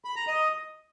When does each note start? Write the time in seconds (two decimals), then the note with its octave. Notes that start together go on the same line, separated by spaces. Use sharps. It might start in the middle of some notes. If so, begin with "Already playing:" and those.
0.05 B5
0.16 A#5
0.28 D#5